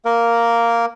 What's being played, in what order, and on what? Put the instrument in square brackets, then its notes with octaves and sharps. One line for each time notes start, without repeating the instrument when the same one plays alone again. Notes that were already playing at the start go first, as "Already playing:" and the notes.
[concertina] A#3 A#4